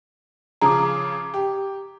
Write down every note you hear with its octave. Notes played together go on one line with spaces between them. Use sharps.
C#3 F3 G#4 A#5 D6
G4